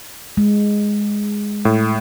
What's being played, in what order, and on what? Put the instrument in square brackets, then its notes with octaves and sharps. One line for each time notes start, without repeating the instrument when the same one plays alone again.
[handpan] G#3
[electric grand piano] A2